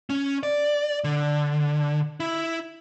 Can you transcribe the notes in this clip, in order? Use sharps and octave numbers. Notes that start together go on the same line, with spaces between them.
C#4
D5
D3
E4